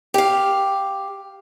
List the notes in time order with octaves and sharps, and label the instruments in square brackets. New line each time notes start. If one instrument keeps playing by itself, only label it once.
[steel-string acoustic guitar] G4 F5